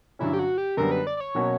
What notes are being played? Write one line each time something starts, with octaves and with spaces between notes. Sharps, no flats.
G2 D3 F#3 C#4 E4
G4
F#4
G4
F#2 D3 G3 B3 A#4
B4
D5
D5
C#5
B2 F#3 A#3 C#4 F#4